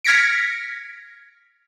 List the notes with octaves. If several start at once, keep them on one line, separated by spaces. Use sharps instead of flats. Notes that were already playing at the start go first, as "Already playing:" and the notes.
F6 G#6 A#6 B6 C#7 D7